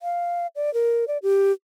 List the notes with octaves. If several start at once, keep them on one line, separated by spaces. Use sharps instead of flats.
F5
D5
A#4
D5
G4